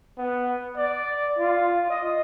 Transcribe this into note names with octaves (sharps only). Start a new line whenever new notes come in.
B3
D5
F4
D#5